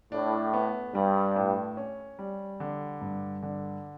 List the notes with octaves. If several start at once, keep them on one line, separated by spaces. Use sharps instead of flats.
A2 D4
B3
G2 G3
A2
C#4
G3
D3
G2
D3